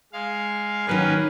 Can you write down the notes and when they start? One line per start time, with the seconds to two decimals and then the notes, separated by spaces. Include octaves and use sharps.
0.13 G#3 F5
0.87 D#3 F#3 A#3 C#4 A#4 B4